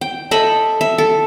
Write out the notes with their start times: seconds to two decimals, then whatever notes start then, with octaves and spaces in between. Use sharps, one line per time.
0.01 G5
0.31 A4 D#5 E5 B5
0.81 E5
0.98 A4